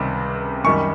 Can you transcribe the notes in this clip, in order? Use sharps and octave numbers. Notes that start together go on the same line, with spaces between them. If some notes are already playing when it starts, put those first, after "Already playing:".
Already playing: C#2 C3 D#3 G3 C4
F#2 D#3 G3 C#6